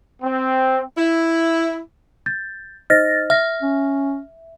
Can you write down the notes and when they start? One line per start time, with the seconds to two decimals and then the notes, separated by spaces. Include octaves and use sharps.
0.23 C4
0.97 E4
2.26 G6 A6
2.90 D#4 C5 D#5 F6 A6 A#6
3.30 E5 F6 A#6
3.62 C#4